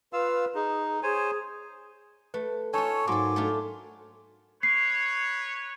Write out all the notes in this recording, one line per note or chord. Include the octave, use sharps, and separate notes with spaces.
F4 B4 F5 E6
D#4 G#4
G#4 C5 C#5 G#5
A3 B4
D#4 F4 A4 C#5 G#5 A5 C#6
G#2 F#3 A#3 A4 G#5 C6 D6
A3 D4 F4
B4 C#5 C7